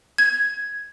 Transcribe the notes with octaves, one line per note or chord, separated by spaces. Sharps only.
G#6